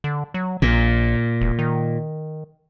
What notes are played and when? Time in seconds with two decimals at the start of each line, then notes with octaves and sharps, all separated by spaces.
0.04 D3
0.34 F#3
0.62 A#1 A#2
1.41 E1
1.59 D#3